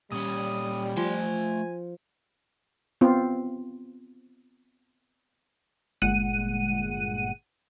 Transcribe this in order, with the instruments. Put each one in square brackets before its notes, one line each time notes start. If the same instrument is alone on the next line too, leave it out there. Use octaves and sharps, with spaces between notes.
[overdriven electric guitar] A#2 C#4 [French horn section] G3 [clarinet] D#6
[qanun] F3 [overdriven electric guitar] A3 C6 [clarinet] G#5
[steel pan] B3 C4 F4
[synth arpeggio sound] G1 A#2 G#3 F#5 D#7